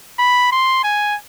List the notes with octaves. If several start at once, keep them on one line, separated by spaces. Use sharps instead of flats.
B5
C6
G#5